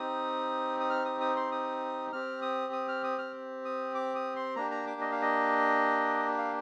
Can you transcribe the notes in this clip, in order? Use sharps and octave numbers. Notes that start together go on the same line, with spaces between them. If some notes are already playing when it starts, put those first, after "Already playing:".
Already playing: C4 D#4 G4 D#6
D#6
F6
D#6
D#6
C6
D#6
C4 G4 F6
D#6
D#6
F6
D#6
F6
D#6
D6
D#6
C6
A#3 D4 G4 A#5
A#5
D6
D#5
F5
D#5
F5